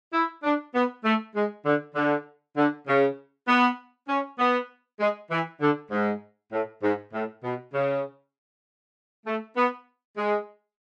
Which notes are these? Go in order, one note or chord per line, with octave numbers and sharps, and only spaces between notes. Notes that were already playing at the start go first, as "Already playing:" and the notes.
E4
D4
B3
A3
G#3
D3
D3
D3
C#3
B3
C#4
B3
G#3
E3
D3
G#2
A2
G#2
A2
B2
C#3
A3
B3
G#3